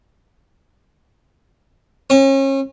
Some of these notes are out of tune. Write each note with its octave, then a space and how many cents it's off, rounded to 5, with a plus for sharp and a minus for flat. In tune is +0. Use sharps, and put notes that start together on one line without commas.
C#4 -35